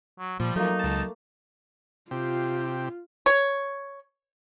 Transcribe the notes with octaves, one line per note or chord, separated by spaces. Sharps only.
F#3
A#2 F3 G3
F#3 A3 A#3 D#4
C#2 A5
C3 F4 G4
C#5